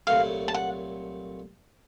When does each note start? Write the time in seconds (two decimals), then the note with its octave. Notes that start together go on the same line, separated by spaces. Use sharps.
0.07 C2 A#2 F#3 A3 F5
0.48 A5
0.54 F#5